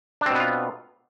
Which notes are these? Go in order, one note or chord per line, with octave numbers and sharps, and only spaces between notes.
B2 B3 C4 D4 F4